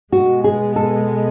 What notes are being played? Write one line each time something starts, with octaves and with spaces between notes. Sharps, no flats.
B2 G#3 B3 F#4
G#4
A4